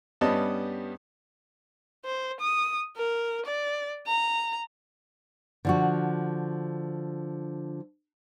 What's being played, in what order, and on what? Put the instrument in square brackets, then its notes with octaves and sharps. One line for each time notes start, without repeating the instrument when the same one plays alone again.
[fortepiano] G2 G3 B3 C#4 D#5 A5
[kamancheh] C5
D#6
A#4
D5
A#5
[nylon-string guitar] D3 F3 F#4